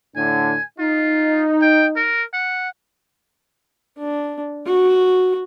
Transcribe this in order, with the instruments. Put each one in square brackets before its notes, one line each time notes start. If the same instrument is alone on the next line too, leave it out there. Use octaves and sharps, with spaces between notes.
[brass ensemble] A2 D3 D4 [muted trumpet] G#5
[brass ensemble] D#4 [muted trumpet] F4
[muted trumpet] G5
A#4
F#5
[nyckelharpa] D4
F#4